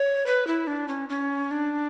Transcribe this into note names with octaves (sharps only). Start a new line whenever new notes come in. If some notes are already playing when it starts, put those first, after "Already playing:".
Already playing: C#5
B4
E4
D4
C#4
C#4
D4